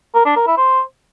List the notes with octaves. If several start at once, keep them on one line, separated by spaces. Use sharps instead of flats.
A#4
D4
A#4
E4
C5